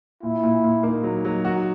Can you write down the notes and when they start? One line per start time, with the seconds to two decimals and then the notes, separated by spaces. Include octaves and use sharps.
0.23 A#2 E4
0.43 A#2
0.64 A#2
0.83 A#3 D#4
1.04 F#3
1.25 F#3
1.45 F#4